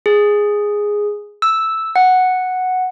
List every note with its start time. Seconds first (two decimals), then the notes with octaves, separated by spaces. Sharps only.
0.06 G#4
1.42 E6
1.96 F#5